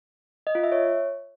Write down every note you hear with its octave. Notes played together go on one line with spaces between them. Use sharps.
D#5
F4
E5
C#5